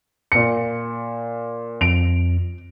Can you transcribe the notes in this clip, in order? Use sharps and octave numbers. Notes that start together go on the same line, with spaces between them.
A#2 C#7
F2 D7 F7